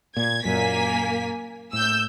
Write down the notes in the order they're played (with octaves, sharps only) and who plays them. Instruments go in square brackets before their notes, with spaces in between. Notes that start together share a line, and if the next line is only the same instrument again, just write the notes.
[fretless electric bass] A#2 [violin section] G#6
[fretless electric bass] F#2 A#2 [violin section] A#3 G#5 B6
[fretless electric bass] A2 [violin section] E6 G6